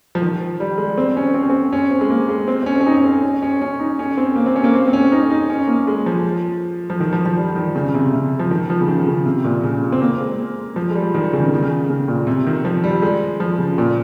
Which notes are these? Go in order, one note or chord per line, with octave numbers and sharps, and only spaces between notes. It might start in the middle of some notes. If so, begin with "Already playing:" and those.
F3
D#3
G3
G#3
C4
C#4
C4
C#4
C4
C#4
C4
G#3
A#3
G#3
C4
C4
C#4
C#4
D#4
C#4
C4
C#4
C#4
C#4
D#4
C#4
C4
A#3
C4
C#4
A#3
C4
C4
C#4
D#4
D#4
C#4
A#3
G#3
F3
F3
D#3
F3
F3
G3
D#3
C#3
C#3
C3
C3
F3
D#3
F3
C#3
D#3
C#3
C3
A#2
C#3
C4
A#3
G#3
F3
G#3
G3
D#3
C#3
D#3
C#3
D#3
C#3
C#3
A#2
C3
D#3
F3
G3
G#3
F3
C#3
A#2